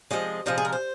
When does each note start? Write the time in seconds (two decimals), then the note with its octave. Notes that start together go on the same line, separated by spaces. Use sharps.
0.11 C3 F3 G#3 D#5
0.46 C3 F3 G#3 D#5
0.58 G#4
0.65 A#4
0.73 C5